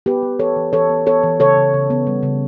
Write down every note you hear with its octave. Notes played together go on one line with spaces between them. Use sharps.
B3 G4 B4
B3
E3 A4 C#5
E3
E3 A4 C#5
B3
B3 A4 C#5
E3
C#3 A4 C#5
C#3
C#3
B3
G3
C#3